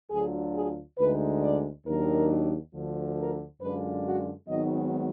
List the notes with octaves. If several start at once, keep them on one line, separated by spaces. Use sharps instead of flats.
D2 D3 F#3 D4 F4 G#4
G#4
D2 D3 G#3 D#4 B4
D5
D#2 D#3 F#3 D4 A#4
D2 D3 F3
A#4
F#2 D3 G#3 D4 F4 B4
F#4
G#1 G#2 D#3 F#3 B3 D#5